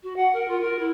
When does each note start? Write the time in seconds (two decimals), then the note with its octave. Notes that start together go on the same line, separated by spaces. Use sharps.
0.02 F#4
0.16 F#5
0.33 A#4
0.48 F4
0.60 A#4
0.78 E4